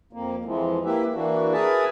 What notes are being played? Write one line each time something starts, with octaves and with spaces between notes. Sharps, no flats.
F2 A#3
F2 E3 F3 G#3
A#3 E4 G4 B4 E5
E3 A#3 D4 F#4
G#4 A#4 B4 E5 G#5 A5